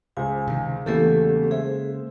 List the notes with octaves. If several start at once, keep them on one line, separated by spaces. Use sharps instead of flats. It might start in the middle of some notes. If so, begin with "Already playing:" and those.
C#2 C5 G#5
C3 D#3
E2 C#3 E3 A3 A#3 G4 A4
G#3 G#4 C5 E5